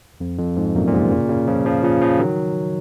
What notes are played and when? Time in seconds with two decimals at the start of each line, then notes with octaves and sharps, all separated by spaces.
0.20 F2
0.39 F2
0.57 F2 G#2
0.75 F#2 A#2
0.87 A#2
0.93 G#2 C3
1.11 A#2 C#3
1.29 A#2 C#3
1.48 C#3 F3
1.65 C#3 F3
1.83 A#2 C#3
2.01 C#3 F3
2.19 D#3 F#3